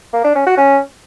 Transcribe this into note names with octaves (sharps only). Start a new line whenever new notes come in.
A#3
D4
C#4
F#4
C#4